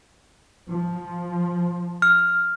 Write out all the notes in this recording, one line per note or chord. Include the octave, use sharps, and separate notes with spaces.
F3
F6